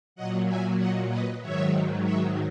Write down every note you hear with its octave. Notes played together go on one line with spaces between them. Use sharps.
A#2 F#3 D#5 F#5
E5 G#5
D#5 F#5
B4 D#5
G#2 D#3 F#3 C#5 E5
C#5 E5